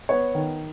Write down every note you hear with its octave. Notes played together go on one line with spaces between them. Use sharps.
B3 C#5
D#3